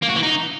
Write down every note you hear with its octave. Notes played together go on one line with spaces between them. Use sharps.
A#3
F#4
E3
D#4